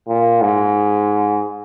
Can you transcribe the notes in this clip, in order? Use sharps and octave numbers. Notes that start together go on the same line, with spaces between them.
A#2
G#2